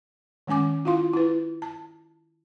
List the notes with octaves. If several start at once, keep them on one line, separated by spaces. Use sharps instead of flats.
D#3 G#3 C#4 G#5 D6
E4 F4 F5 C6
E4 B4
A5